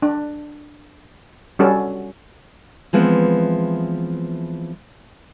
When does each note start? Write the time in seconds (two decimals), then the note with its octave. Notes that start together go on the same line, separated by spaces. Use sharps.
0.02 D4
1.59 G3 C#4 F#4 A4
2.93 E3 F3 G#3 B3 C4